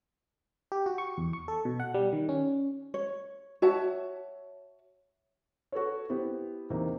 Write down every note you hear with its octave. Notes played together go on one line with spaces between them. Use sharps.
G4
F#4
C#6
E2
C#6
A4
B2
F#5
G3
D#3
C#4
C#5
F#4 C#5 E5 A5
F#4 A4 B4 C#5
B3 E4 G4 C5
E2 C3 A#3 D#4